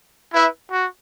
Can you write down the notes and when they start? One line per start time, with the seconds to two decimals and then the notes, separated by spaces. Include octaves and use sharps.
0.31 E4 B4 E5
0.71 F#4